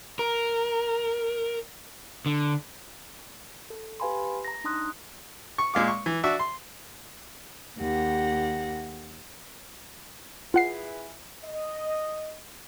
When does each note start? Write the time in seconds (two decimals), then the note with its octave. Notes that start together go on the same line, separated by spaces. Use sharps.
0.19 A#4
2.26 D3
3.70 A4
4.00 G4 B4 F5 G#5 B5 C6
4.45 A#5 A#6
4.64 D4 D#4 A#5 C6 D#6 F#6
5.58 C#6
5.74 A#2 G#3 F5 D6
5.88 C#6
6.06 E3
6.23 D4 F#4 E5
6.39 C6
7.78 D#2 G4 F#5 A#6
10.54 E4 F4 G#4 B4 F#5 C7
11.44 D#5